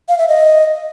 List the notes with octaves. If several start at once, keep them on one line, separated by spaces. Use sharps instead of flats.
F5
E5
D#5